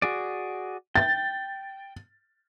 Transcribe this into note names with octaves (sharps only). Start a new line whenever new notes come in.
F#4 G#4 D5
G5 A6